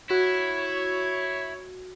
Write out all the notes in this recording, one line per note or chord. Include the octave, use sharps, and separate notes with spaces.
E4 F#4 C#5